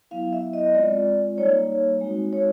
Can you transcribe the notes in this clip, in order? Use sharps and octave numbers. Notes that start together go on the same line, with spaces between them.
F#3 B3 E4 F5
E5
D#5
G#3 C4 F4 D5
G3 A#3 D#4 C#5
G#3 C4 D#4 F#4
C#5